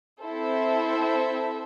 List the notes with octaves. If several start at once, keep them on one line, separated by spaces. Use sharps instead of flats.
C4 E4 A4 C5 E5